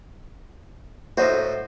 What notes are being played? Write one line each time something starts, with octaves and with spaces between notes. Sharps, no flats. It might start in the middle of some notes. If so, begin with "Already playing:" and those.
A2 D#4 F#4 C5